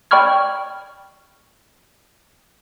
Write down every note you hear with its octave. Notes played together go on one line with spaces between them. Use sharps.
D5 G5 B5 C#6 F6 G#6